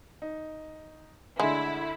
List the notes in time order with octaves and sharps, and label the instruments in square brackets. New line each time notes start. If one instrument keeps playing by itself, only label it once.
[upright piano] D#4
[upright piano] D2 D3 [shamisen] G#3 [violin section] E4